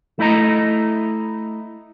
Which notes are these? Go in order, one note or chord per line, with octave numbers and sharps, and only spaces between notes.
A3 E4 D#5 A#5